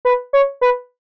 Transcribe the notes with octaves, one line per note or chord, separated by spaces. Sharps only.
B4
C#5
B4